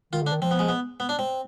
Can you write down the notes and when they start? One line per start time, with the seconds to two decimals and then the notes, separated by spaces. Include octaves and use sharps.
0.13 D#3 F4
0.23 D3 D4
0.32 D#3
0.41 F3 C4
0.51 B3
0.59 G#3
0.69 B3
1.00 B3
1.09 D4
1.19 C4